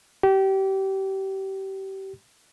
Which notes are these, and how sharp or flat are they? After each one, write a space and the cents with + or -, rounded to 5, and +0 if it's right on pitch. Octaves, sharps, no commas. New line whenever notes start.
G4 -25